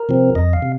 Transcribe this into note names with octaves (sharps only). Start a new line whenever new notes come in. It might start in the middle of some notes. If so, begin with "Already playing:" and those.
Already playing: A#4
C3 F3 C4
F2 D#5
F5
C3